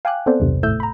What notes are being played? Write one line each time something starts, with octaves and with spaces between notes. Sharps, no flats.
F5 G5 G#5 D6 F#6
B3 C4 A4 C5 D5
B1 E2 G2 C3
G#1 A2 A3 E6 G6
A#5 B5